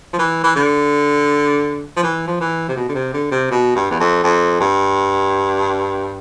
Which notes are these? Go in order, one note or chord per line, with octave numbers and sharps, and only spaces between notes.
F3
E3
E3
D3
F3
E3
F3
E3
C3
B2
D3
C3
D3
C3
B2
G2
E2
F2
F2
G2